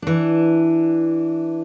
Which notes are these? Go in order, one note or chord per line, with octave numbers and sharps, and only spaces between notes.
E3 D4